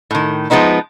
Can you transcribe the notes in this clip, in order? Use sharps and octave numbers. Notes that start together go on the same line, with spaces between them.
A2 D#3
F3 G#3 B3 D#4 E4